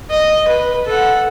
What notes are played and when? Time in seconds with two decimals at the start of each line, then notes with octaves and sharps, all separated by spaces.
0.10 D#5
0.48 B4
0.87 A4 F#5